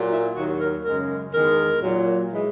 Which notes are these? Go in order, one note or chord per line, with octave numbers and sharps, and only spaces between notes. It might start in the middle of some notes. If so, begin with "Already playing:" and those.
Already playing: A#2 F#3
E4
D#2 D#3 F#3 F#4
A#4
F#2 C#3 G#3 A#4
E2 D#3 G#3 A#4
A#2 F#3
E3 G#3